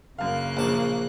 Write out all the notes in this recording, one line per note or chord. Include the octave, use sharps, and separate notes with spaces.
F#2 C#3 A#3 F5 F#6
A#1 A5 C#6